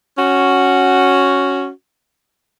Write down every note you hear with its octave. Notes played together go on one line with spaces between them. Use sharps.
C#4 F#4